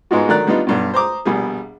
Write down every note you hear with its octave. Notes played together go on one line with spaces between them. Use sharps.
G#2 G#3 B3 D#4 F4 F#4
D3 D#3 F#3 D5 A#5 F#6
G3 B3 D4 D#4 F4
B1 G2 B2
C5 A#5 D6 D#6
A#1 B2 G3 G#4